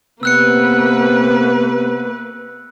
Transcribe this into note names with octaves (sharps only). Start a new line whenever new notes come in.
C3 A#3 B3 B4 E6 F#6 C#7